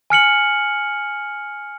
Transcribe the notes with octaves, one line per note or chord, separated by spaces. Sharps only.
G#5 F6 C#7 F#7